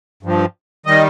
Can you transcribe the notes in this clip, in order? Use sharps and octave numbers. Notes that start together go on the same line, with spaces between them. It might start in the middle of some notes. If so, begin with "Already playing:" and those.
G2 F3
D#3 G3 D#5